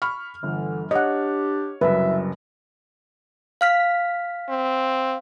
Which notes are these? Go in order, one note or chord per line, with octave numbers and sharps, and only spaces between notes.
B5 C#6 F6
G1 D3 E3
D4 G4 C#5 D#5 F#5
F#1 C2 F#3 B4 E5
F5 F6 B6
C4